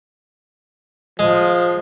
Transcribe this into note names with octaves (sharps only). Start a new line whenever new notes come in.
F3 G#3